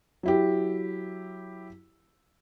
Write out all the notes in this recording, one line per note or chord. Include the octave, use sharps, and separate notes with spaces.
F#3 E4 G4